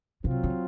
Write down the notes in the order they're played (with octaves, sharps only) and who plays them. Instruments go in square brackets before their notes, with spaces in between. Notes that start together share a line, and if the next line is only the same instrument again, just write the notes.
[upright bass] C3 [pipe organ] F#3 C4 F4
[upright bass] C#3